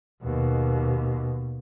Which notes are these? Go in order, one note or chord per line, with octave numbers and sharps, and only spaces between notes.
D#2 B2